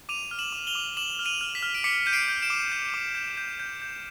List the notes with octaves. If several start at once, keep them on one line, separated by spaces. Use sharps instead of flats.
D6 D#7 F7
F6
E7 F#7
D6
F7 G7
D6
D6 E7 F#7
F6
D#7 F7
F6
B6
F6
D7
D6 B6 C#7
G6 D#7
C7 D7
G6
D7 E7
D6
G6
D6
G6
G6
G6
G6